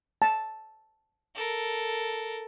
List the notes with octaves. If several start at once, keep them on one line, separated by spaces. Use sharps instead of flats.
A5
A4 A#4